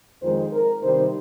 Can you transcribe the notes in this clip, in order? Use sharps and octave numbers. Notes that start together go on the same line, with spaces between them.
F2 D#3 G#3 D#4 C5
A#4
C3 D#3 G3 C4 D#4 C5